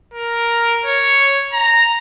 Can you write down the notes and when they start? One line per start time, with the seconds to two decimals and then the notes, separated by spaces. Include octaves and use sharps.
0.14 A#4
0.86 C#5
1.54 A#5